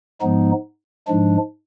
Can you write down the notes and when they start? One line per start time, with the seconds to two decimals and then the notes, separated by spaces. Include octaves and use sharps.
0.21 G#2 F3 G#3 B3 D#4
1.07 G#2 F3 G#3 D4